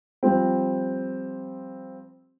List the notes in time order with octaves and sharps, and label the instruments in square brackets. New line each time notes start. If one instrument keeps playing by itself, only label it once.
[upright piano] F3 G3 C4